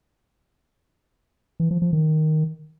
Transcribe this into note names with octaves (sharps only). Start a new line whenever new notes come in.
E3
F3
F3
D#3